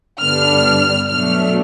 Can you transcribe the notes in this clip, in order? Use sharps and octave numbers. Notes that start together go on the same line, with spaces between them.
G2 D3 G3 B3 D4 F6
B2 F#3 A3 D4 F6